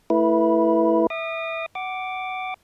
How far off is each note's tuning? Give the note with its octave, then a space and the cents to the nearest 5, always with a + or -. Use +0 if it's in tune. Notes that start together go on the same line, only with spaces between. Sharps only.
A3 +0 E4 +0 B4 -20
E5 -10 D#6 -35
F#5 +15 D6 +0